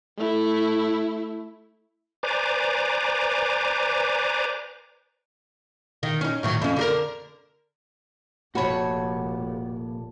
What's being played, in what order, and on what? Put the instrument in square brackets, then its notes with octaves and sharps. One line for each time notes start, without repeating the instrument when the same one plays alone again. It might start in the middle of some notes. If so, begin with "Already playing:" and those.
[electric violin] A3 E4
[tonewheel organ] B4 C5 D5 G#5 A#5 D6
[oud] D#3
C#4 D#4
A2 D#3 F#3
F2 C#4
D3 G4 A#4
[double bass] F1 [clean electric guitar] A#2 A4 B5 [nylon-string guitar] F#4 C#5